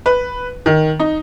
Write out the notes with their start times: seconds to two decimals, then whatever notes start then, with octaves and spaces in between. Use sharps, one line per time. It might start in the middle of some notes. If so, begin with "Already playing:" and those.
0.06 B4
0.66 D#3
0.99 D#4